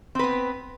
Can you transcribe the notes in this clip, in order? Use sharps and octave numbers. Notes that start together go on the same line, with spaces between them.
B3 C4 B4